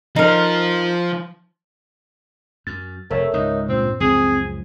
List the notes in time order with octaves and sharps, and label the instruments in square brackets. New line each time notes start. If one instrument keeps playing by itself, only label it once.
[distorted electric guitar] F3 [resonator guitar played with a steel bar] D#4 A#4
[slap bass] F#2 [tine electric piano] A6
[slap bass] F1 [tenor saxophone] A3 [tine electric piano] A#4 C#5 E5
[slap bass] C#2 G#2 [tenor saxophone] D#4
[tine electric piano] G2 A#2 [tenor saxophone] C4
[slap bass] C#2 F#2 F3 [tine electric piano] C4 [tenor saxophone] G#4